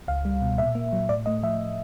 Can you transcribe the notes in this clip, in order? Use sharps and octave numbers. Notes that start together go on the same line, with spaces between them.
C#2 F5
G3
B2
A#2 E5
A#3
F#3
A2 D5
A3 D#5
F3 E5